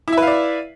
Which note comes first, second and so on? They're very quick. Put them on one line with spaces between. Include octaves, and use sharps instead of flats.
E4 E5 B4 F5 D5